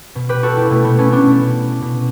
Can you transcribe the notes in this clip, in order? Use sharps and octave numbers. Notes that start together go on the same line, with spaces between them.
B2
G4 B4
F#4 A4
E4 G4
B2 A3
B3
A3 C#4
B3 D4
B2
B2